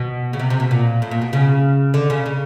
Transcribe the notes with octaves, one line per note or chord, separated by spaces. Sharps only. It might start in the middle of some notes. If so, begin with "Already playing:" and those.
Already playing: B2
C#3
C3
C3
B2
A#2
A2
A#2
B2
C#3
D3
C#3
C#3